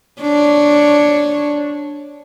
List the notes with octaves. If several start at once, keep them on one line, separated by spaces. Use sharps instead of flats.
D4 C#5